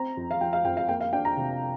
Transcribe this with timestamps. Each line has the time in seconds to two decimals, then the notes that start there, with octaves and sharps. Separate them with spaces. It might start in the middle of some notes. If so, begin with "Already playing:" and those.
Already playing: C4 A#5
0.17 F2
0.31 F5
0.41 F3 G5
0.53 F5
0.65 F2 G5
0.77 F5
0.89 A#3 G5
1.01 F5
1.13 D4 G5
1.25 A#5
1.37 C3